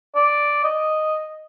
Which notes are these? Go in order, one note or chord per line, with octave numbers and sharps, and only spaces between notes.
D5
D#5